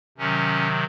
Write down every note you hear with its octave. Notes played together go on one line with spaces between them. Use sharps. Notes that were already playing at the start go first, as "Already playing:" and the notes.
C3 D#3 F#3 C#4